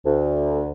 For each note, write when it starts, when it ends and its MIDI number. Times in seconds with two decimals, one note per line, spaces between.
0.05 0.72 38